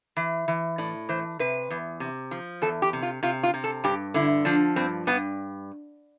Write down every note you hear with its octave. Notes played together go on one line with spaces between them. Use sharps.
E3
E3
A2 D5
E3 C5
C3 B4
E2
C3
F3
E2 A4
G4
C3
F4
C3 F4
F4
C3
A4
G2 G4
D3 E4
F3 D4
G2 C4
G2 B3